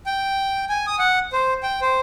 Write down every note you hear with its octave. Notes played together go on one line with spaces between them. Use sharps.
G5
G#5
D#6
F#5
C5
G5
C5